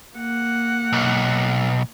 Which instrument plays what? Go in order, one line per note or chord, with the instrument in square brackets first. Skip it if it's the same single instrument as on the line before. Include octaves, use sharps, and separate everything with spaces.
[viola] A#3 F#5
[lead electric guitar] B1